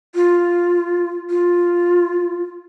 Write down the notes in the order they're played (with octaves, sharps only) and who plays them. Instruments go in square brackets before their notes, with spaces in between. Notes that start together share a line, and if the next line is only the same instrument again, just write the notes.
[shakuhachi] F4
F4